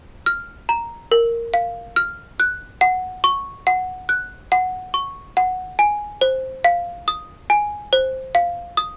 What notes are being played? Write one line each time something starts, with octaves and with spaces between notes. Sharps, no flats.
F6
A#5
A#4
F5
F6
F#6
F#5
C#6
F#5
F#6
F#5
C#6
F#5
G#5
C5
F5
D#6
G#5
C5
F5
D#6